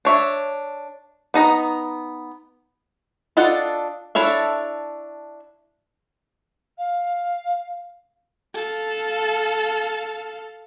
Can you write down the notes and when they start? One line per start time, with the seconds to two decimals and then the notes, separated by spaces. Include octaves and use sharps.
0.05 D4 C#5 E5
1.34 B3 D#4 A#5
3.37 D4 F4 A4 D#5 F#5
4.15 D4 E4 A4 C#5 E5
6.78 F5
8.54 A4 F5